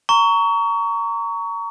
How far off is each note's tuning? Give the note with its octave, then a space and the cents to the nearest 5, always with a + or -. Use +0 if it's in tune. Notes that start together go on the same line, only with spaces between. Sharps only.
A#5 -15 C#6 +25